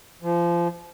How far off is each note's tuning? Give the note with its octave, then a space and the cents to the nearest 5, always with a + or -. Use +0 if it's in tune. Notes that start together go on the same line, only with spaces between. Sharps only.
F3 -25